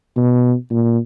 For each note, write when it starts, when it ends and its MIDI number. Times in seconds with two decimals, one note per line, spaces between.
0.17 0.54 47
0.71 0.98 46